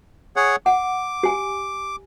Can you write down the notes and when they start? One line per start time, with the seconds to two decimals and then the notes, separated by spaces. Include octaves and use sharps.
0.36 G#4 C#5 F#5
0.66 F#5 D6
1.23 G4 G#5